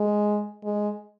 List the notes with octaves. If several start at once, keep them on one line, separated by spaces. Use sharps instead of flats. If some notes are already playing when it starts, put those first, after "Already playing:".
Already playing: G#3
G#3